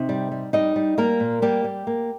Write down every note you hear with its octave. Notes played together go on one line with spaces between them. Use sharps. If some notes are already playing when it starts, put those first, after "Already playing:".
Already playing: C3 D#4
G3
G3
G3 D#4 D#5
G3
G3 A#3 A#4
A#2
G3 A#3 G4
G3
A#3